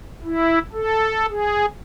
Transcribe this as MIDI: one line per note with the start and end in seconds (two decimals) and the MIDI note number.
0.24 0.59 64
0.73 1.26 69
1.30 1.66 68